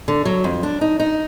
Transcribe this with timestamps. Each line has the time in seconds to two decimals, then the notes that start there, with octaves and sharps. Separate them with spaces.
0.08 D3
0.25 F#3
0.44 F2
0.63 D4
0.81 D#4
1.00 D#4